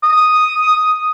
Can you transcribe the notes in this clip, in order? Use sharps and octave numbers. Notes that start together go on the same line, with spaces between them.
D#6